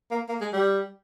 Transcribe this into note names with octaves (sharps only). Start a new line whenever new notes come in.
A#3
A#3
G#3
G3